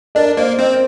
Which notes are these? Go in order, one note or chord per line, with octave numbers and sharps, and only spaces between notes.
D4 A#4 D5
A#3 C5 D#5
C4 C5 D#5